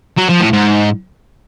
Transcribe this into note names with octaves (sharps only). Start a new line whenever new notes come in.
F#3
F3
A2
G#2